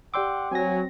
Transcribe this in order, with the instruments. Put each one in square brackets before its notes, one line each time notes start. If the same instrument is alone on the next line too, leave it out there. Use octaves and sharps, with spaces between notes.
[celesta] G4 D5 E6 [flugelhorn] F#5 [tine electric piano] G5 C6 D6
[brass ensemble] F#3 [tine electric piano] C4 A#6 [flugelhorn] G#5